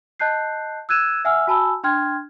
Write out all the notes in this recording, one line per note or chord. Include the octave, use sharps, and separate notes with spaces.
D#5 A5 F#6 G6 C7
E6 F#6 G#6 D#7 E7
E5 F#5 G#5 E6 F6
F#4 G#5 A5 B5 E6
D4 G5 C6 F6 G#6